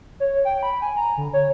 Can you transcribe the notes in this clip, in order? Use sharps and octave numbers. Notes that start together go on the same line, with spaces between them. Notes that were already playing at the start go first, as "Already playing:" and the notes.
C#5
G5
B5
G#5
A#5
D3
C#5